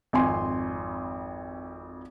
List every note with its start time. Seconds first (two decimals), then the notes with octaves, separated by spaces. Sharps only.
0.13 G#1 F2 G#5 C6